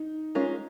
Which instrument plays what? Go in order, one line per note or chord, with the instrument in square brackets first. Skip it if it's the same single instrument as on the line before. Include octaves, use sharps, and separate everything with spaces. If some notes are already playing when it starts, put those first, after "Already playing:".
Already playing: [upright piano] D#4
[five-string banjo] G#3 C#4 F4 A#4